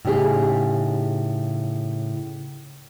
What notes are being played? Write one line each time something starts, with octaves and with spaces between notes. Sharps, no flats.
A2 C#3 D#4 G4 G#4